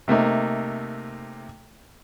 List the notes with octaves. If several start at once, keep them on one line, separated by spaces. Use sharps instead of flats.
C3 A3 A#3 D#4